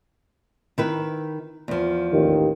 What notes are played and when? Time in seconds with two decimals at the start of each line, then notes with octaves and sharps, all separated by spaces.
0.78 D#3 E4 B4
1.68 E2 F3
2.13 A1 D#2 D#3